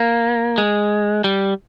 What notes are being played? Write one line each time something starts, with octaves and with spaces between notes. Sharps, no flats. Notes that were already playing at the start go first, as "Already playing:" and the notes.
Already playing: A#3
G#3
G3